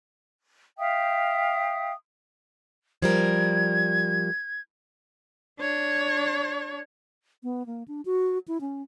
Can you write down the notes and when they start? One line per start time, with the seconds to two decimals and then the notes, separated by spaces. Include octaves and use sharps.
0.78 E5 F5 G5 D#6
3.02 F3 G3 A#4 G#6
5.60 D4 C#5
7.43 B3
7.66 A#3
7.88 D4
8.05 F#4
8.48 E4
8.61 C#4